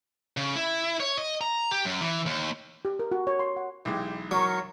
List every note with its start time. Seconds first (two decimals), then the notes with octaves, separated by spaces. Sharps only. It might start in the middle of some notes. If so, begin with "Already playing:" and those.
0.37 C#3
0.56 E4
1.00 C#5
1.18 D#5
1.41 A#5
1.71 G4
1.85 F#2
2.01 E3
2.26 D#2
2.85 G4
2.99 A#4
3.12 F#4
3.27 C#5
3.39 C6
3.57 F#5
3.85 B1 E3 G#3 G4
4.31 F#3 A#4 C#6